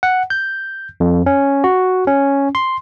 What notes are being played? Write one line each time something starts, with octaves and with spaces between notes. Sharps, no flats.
F#5
G6
F2
C#4
F#4
C#4
C6